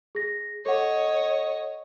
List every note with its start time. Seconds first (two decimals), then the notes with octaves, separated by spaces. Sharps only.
0.15 G#4 A#6
0.66 A4 C#5 D#5 F#5